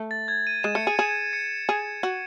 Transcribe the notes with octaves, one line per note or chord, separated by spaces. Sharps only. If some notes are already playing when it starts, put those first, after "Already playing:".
Already playing: A3
A6
G#6
D#7
G#3 E7
A3 C#7
G#4 D#7
G#4 E7
C#7
G#4
F#4